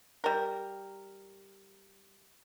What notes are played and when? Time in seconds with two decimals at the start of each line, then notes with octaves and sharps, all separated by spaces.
0.24 G3 A#4